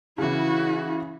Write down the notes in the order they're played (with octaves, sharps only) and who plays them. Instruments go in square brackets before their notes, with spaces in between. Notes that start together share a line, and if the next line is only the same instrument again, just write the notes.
[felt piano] C#3 E3 [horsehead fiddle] E4 F#4